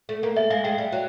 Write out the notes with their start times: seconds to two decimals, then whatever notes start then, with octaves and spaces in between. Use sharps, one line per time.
0.09 A3
0.23 A#3
0.36 G#3 E5
0.50 G#3 F5
0.64 G#3 G5
0.78 G3
0.92 F#3